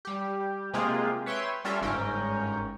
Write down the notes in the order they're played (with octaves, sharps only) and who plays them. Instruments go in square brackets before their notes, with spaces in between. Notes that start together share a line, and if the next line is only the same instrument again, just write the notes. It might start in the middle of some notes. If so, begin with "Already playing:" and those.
[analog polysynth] G3 G4
C3 G#3 A#3 F4 G4 G#4
B4 C#5 E5 G5 C6
G3 C#4 F4 A4 A#4 E5
G1 G#2 C#4 A#4 G5